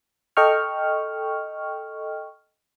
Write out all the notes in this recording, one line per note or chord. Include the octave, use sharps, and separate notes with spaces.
A4 D#5 G5 C#6 F6